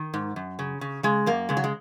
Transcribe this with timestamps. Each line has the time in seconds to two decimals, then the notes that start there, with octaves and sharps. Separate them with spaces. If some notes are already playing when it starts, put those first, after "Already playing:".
Already playing: D#3
0.14 G#2
0.36 F#2
0.59 C#3
0.81 C#3
1.03 C#3 G#3
1.26 F#2 A#3
1.49 C#3 G#3
1.57 F#3
1.64 G#3